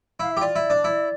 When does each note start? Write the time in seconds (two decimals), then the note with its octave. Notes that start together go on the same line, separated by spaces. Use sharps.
0.20 E4 F5
0.32 E5
0.37 G4
0.41 F4 D5
0.56 E4
0.70 D4
0.84 E4